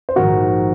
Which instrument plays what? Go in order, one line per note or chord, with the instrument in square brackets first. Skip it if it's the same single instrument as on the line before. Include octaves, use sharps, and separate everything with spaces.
[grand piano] C5
[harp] A#1 G#2 D#3 [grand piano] F#4 A#4